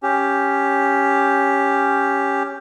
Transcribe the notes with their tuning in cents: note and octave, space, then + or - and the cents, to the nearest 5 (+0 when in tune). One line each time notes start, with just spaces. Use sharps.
C#4 +5 G4 +0